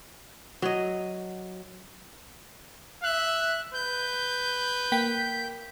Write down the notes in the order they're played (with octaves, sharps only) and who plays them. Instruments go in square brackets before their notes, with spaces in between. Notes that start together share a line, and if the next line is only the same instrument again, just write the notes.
[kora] F#3 D#5
[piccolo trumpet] E5 [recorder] F#6
[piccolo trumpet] B4 [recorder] G6
[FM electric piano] A#3 G5 B6